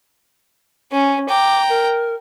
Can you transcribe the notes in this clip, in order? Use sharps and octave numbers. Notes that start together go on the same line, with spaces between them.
C#4 G#5
G5 A#5 D6
A#4